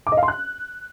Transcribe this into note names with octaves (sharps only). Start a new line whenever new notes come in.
D6
D#5
F5
C6
F#6